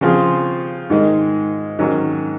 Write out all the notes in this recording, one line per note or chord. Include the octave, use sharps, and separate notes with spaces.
C#3 F3 C4 F4 G#4
G#2 D#3 G#3
G#2 D#3 F#3 C#4